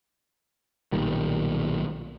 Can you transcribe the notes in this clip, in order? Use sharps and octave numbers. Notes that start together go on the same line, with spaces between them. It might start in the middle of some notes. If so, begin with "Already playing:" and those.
B1 A#2 D#3 G3